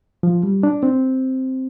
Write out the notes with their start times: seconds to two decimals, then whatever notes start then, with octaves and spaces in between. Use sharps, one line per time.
0.23 F3
0.43 G3
0.63 D4
0.83 C4